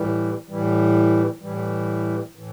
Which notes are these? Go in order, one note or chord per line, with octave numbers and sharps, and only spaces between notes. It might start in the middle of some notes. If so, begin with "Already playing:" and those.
Already playing: A2 E3 G3
A2 E3 G3
A2 E3 G3
A2 E3